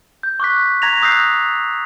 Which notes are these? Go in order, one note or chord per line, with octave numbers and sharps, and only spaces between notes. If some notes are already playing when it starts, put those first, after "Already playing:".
G6
C#6 D6 F#6 B6
A#5 G#6 A#6 B6 F7
D#6 E6 F#6 G6 A#6 C7